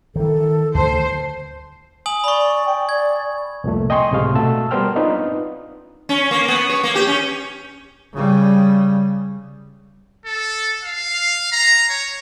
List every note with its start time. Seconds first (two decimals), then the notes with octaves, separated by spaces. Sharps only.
0.16 D#3 E3 A4
0.75 D2 D3 D#3 C5 A5
2.06 G#5 D#6 F#7
2.24 D5 B5 C#6
2.66 G5
2.89 D5 G#6
3.64 C2 F2 A#2 A3
3.90 D#5 G5 G#5 C6 C#6
4.11 C#2 A2 C3 G#3 F5 C6
4.35 B2 A3 F#4 A5 E6
4.71 G3 B3 A#4 C5 G5 F6
4.96 B3 C4 D4 D#4 F4 B4
6.09 C#4
6.31 A#3
6.48 B3
6.69 C#5
6.83 A#3
6.95 G4
7.07 C#4
8.13 C#3 G3
10.25 A4
10.83 F5
11.52 A#5
11.89 C#5